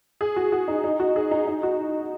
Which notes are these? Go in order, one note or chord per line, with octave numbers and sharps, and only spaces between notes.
G#4
F#4
F#4
D#4
D#4
F#4
G#4
D#4
D#4
F#4